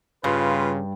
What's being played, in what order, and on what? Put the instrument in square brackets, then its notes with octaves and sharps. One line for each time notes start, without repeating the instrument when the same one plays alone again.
[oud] G2 [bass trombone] C#3 [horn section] F4 B4